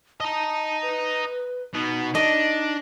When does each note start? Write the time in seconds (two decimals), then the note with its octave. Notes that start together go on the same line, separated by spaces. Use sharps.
0.20 D#5 A5 A#5
0.82 B4
1.74 B2 B3 D#4
2.15 D4 D#5